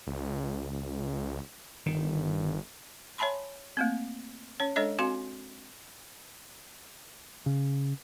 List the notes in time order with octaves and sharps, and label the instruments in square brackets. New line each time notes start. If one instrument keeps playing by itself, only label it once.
[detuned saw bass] C#2
[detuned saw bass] G1 [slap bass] D#3
[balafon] C#5 E5 G#5 A5 B5 C6
A3 A#3 C4
C#4 C#5
G#3 D4 A4 C#5 D#5 E5
C4 F#4 F5 G#5 C6
[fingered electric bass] C#3